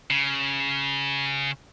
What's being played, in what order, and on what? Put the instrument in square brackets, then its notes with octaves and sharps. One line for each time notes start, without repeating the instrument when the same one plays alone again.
[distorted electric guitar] C#3